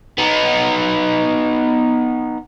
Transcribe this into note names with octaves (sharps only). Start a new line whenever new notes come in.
B3 D#4